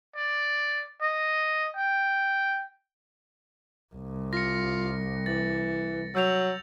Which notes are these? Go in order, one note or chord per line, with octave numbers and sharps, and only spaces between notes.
D5
D#5
G5
C2
F4 A#6 C#7
E3 A6
F#3 E6 G6 F7